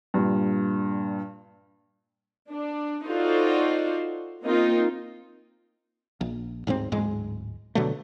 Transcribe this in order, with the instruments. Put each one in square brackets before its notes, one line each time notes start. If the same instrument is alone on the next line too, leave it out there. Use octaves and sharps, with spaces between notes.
[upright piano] G2 A#2
[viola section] D4
D#4 F4 F#4 A4 C5 D5
A#3 C4 D#4 F4
[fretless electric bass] A#1
D1 G#2 A3 C4
D1 G#2 G#3
B2 D3 F#3 A3